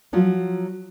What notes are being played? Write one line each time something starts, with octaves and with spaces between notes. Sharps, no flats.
F3 F#3 F4